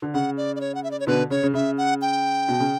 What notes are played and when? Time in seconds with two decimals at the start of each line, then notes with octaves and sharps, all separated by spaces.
0.02 D3
0.14 C#3 F#5
0.37 D5
0.56 D5
0.61 C#5
0.75 F#5
0.84 E5
0.91 D5
1.00 C#5
1.07 B2 D3 B4
1.30 C#3 C#5
1.43 C#3
1.54 C#3 E5
1.78 F#5
2.02 G5
2.48 B2
2.60 C#3